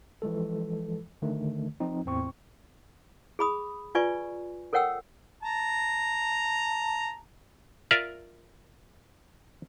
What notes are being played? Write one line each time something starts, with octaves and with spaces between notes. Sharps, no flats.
E3 F3 G#3 A4
D3 D#3 A3
F3 C4 D#4
E2 A2 C4 C#6
G#4 B5 D#6
F4 B4 D5 G#5 C#6
A4 A#4 C#5 F#5 G5 E6
A5 A#5
F4 A#4 D5 E5